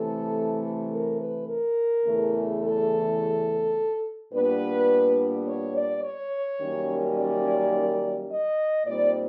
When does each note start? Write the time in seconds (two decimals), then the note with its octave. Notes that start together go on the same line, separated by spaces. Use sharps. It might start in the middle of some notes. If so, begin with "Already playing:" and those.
Already playing: C3 E3 A3 A4
0.91 A#4
1.19 B4
1.48 A#4
2.05 E2 C#3 E3 A3
2.62 A4
4.32 A#2 G3 B3 D4 B4
5.46 C#5
5.74 D5
6.02 C#5
6.60 F#2 D#3 G3 A#3 C#4
7.16 D5
8.29 D#5
8.86 A#2 G3 C4 D#4 D5